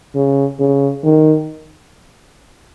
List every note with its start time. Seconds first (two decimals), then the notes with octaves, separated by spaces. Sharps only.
0.15 C#3
0.60 C#3
1.04 D#3